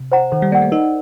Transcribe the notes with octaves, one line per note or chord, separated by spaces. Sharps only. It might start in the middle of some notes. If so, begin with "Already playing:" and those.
Already playing: C3
C5 F#5 A#5
D#3 A4
G3
A#3 D5 F#5
A3
D#4 A#4